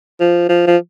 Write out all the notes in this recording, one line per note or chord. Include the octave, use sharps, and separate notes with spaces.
F3
F3
F3